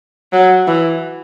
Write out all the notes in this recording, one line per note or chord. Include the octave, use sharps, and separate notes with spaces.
F#3
E3